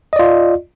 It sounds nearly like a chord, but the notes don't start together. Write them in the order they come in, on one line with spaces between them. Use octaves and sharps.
D#5 D5 F4